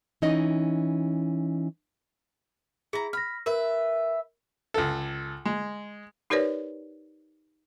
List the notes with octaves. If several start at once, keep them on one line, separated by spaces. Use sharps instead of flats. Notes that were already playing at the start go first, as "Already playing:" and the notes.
E3 C#4 D#4 D#5
E4 G#4 A#5
B5 F6 A#6
A#4 B4 E5
C#2 A4
G#3
D#4 G4 A#4 B4 C#5 D5